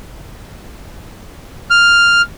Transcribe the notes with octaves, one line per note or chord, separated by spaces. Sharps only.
F6